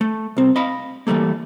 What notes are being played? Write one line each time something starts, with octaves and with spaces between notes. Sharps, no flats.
A3
C2 C4
D#5 F5 B5
E3 F3 G3 A3 A#3